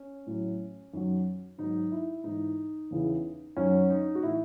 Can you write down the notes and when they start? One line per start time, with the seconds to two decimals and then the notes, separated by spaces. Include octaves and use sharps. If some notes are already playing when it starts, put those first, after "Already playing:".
Already playing: C#4
0.26 A2 F#3
0.93 F#2 D#3 F#3
1.58 G#2 D#3 F#3 D#4
1.92 E4
2.24 G#2 E3 D#4
2.91 E2 C#3 E3
3.57 F#2 D#3 F#3 C#4
3.90 D#4
4.15 F#4
4.22 A2 E3 E4